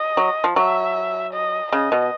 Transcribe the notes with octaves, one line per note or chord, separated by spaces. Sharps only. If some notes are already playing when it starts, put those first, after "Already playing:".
Already playing: D#5
F#3
F3
F#3 E5
D#5
C#3 D#5
B2